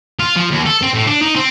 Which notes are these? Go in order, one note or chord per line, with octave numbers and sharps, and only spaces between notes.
F4
F3
D#2
A4
C4
A2
D4
D#4
C4